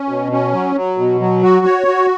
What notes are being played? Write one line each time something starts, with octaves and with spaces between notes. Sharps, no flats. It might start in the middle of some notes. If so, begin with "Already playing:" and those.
Already playing: C#4
B2
C#4
F#3
F#3
B2
F#3
F#4
C#5
F#4